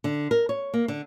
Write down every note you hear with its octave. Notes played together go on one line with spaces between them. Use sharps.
D3
A#4
C#5
A#3
D3